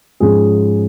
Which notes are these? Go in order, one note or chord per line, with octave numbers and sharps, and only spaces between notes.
G#2 F3 G#3 C#4 G#4